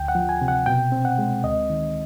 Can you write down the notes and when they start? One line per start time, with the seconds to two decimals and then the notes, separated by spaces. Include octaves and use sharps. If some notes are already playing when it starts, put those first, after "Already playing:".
Already playing: D2 G5
0.08 F#5
0.15 F3
0.29 G#5
0.42 C3
0.48 F#5
0.66 B2 G5
0.92 C4
1.05 F#5
1.18 G#3
1.44 D2 D#5
1.70 D#3